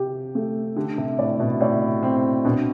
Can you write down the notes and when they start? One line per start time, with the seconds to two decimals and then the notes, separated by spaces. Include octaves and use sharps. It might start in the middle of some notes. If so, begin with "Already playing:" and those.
Already playing: C3 G4
0.35 A3
0.76 D3 G4
0.98 C3
1.19 A2 D5
1.40 B2
1.61 A2 D5
2.03 C4
2.45 B2 D4